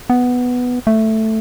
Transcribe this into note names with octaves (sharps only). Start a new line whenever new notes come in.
B3
A3